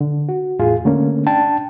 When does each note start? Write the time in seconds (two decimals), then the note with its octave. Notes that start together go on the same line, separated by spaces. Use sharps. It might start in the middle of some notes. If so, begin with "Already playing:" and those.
0.01 D3
0.29 F#4
0.59 E2 A2 F4 G#4
0.85 D3 A3 A#3 C#4
1.27 D4 G5 A5